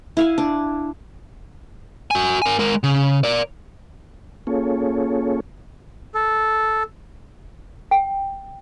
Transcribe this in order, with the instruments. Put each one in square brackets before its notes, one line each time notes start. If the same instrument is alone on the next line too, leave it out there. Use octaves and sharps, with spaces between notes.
[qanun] E4 F5 G#5
D4
[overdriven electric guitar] F#4 G#5
A#4 G#5
G#3 A#4
C#3
A#4 D5
[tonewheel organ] A#3 C#4 F4 G#4 A4 C#5
[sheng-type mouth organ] A4
[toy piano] G5